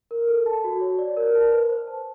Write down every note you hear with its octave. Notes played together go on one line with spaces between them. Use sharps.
A#4
A4
A5
F#4
C#5
D5
A#4
A5
B4
C5
A5